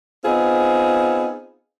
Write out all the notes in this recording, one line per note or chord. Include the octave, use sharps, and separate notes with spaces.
B3 C4 D#4 F4 G#4